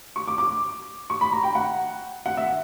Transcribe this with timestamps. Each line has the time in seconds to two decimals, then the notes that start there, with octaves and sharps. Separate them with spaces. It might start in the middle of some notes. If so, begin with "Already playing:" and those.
0.16 C#6
0.28 D6
0.38 D6
1.10 C#6
1.21 B5
1.32 A#5
1.43 G5
1.55 F#5
2.26 F#5
2.37 E5